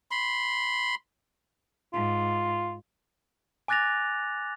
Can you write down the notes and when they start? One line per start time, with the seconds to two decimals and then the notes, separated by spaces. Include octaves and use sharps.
0.11 B5 C6
1.93 G#2 F4
3.68 G#5 D6 F#6 A6 A#6 F7